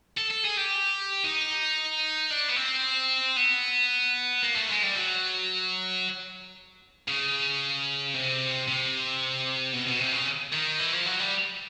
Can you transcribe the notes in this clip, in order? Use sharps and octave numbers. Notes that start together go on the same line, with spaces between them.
A4
A4
G#4
G4
D#4
D4
B3
C4
B3
A#3
A3
G#3
G3
F#3
C#3
C3
C3
B2
B2
C3
C#3
D#3
E3
F3
F#3
G3